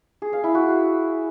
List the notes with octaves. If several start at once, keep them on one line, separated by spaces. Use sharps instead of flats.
G#4
F5
E4
F#4